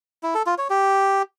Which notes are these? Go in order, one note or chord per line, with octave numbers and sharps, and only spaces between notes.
E4
A4
F4
C#5
G4